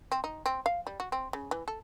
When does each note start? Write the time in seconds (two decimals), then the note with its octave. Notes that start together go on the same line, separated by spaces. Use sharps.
0.12 C4
0.24 D#4
0.46 C4
0.66 F5
0.87 G3
1.00 F#4
1.12 C4
1.33 C#3
1.51 E3
1.68 A4